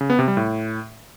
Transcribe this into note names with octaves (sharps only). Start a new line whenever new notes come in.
C#3
B3
C3
G3
A2